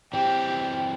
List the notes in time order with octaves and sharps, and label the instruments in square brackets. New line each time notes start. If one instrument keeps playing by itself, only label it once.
[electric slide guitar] E3 C4 [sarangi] G4